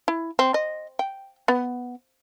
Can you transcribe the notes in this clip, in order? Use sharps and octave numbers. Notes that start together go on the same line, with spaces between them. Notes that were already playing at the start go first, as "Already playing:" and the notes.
E4
C4
D#5
G5
B3